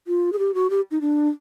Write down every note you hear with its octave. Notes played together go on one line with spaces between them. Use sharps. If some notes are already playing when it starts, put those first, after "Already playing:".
F4
G#4
G4
F#4
G4
D#4
D4